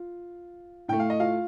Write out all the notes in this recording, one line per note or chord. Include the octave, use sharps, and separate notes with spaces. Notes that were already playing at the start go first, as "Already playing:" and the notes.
Already playing: F4
A2 A3 G5
F5
D#5
F4 F5